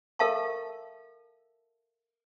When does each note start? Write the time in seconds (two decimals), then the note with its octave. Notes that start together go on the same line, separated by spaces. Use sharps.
0.19 A4 A#4 E5 F5 A5 C#6